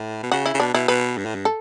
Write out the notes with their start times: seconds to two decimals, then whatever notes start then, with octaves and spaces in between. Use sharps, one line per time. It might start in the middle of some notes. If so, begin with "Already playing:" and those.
Already playing: A2
0.23 B2
0.32 C#3 F#4
0.46 E4
0.54 C#3
0.60 B2 D4
0.74 B2 E4
0.88 B2 B4
1.18 G2
1.26 A2
1.35 G2
1.45 A4